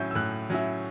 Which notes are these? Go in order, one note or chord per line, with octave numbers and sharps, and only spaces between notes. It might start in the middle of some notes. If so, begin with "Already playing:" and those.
Already playing: A2 F#3 C#4 E4 G6
E6
A2 F#6
F#3 C#4 E4